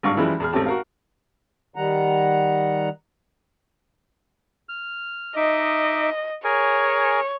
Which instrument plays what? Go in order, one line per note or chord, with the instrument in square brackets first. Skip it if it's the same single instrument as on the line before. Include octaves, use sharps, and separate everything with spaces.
[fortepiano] G#1 G2 F5 C#6
F#2 E3 F3 G3 G#3 E4
E2 G#4 F6
G#1 A3 C4 C#4 G4 A5
F#4 A#4 F5
[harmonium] D#3 G3 F#5 A#5
[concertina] F6
[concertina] D#4 E5 D6 [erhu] D#5
[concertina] G#4 A#4 G#5 [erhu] C#5